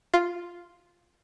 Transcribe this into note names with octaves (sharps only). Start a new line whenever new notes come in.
F4